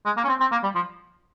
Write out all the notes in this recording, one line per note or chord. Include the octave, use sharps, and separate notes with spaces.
G#3
A#3
C#4
C4
C4
A#3
G3
F3